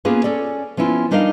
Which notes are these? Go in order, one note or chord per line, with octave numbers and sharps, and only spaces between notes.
A#3 B3 C#4 F4 G#4 B4
C#4 A4 D5
F3 B3 C#4 E4 F4
G3 D4 D#4 A#4 D#5 F5